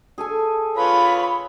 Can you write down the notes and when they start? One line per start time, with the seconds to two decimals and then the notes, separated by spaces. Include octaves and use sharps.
0.18 G#4 A4 G#5
0.77 F4 B4 C#5 B5